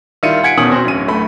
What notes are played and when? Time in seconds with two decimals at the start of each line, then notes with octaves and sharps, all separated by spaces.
0.23 D#3 G3 E4 F4 C#7 D#7
0.43 F#5 G#5 G#6 B6 C#7 D7
0.57 E2 B2 D#3 C#4 D#6 F#7
0.71 C4 C#4 F#4 C5
0.85 D1 C#4 D#7
1.08 D1 A3 B5